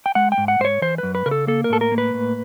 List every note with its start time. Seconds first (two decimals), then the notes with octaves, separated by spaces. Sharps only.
0.06 G5
0.15 G#3 F#5
0.32 G5
0.38 G#2
0.48 F#5
0.59 G#2 C5
0.65 C#5
0.82 E3 C5
0.98 F#2 B4
1.15 B4
1.26 C#3 A#4
1.31 A4
1.47 A#3 A4
1.64 A#4
1.70 A2 A4
1.81 A#4
1.92 A#3
1.98 B4
2.14 A2